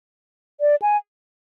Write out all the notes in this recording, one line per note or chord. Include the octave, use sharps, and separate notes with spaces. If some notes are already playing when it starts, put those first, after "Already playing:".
D5
G#5